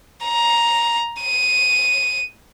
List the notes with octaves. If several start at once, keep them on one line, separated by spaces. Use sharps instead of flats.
A#5
D#7